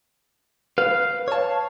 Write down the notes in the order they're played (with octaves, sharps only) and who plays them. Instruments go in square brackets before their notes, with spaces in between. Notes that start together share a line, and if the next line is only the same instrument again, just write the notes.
[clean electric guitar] B4 [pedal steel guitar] F5
[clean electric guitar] C#5 A5